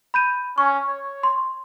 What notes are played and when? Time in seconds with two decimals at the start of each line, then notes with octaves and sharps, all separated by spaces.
0.14 B5 G6 D#7
0.58 C#4 C#6
0.88 C#5
1.23 C6